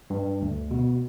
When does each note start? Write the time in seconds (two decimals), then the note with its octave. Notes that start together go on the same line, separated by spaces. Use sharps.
0.10 G2
0.42 D2
0.71 B2